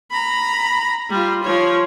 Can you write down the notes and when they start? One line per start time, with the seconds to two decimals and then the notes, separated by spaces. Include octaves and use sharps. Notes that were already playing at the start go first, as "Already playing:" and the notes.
0.11 A#5 B5
1.10 G3 F4
1.43 F3 C#5